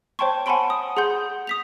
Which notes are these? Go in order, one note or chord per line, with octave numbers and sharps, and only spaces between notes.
C5 C#5 G5 A5 C6 C#6
F#5 G#5 A5 B5 C6 D7
D#6
G#4 F#5 C6 G6
D#6 B6 F7